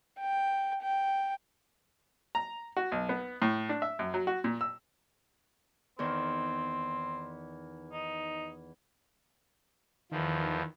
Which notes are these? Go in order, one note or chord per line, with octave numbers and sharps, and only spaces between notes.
G5
G5
A#5
F#4
B1
B3
A2
D4
E5
F#2
F#3
F#4
A#2
E6
E2 D#3 C4
D#4
E2 D#3 F3